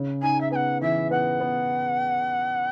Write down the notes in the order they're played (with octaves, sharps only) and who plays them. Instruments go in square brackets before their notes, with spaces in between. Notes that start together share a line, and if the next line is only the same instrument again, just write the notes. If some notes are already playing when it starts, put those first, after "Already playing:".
Already playing: [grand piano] C#3
[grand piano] D#4 [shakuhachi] G#5
[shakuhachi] E5
[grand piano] B3 [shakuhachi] G#5
[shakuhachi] F#5
[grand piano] E3 [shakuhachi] E5
[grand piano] B3 [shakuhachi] F#5
[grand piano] B3